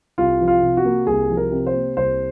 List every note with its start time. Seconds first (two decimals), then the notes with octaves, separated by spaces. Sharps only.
0.18 C2 F4
0.41 F3
0.48 F4
0.62 C3
0.77 F#4
0.85 A#3
1.07 C2 G#4
1.30 F3
1.37 A#4
1.52 C3
1.67 C5
1.74 A#3
1.96 C2 C5